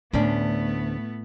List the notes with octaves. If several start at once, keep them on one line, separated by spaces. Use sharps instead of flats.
D2 A2 A3 B3 C#4 D4